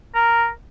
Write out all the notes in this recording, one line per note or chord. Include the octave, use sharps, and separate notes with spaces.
A#4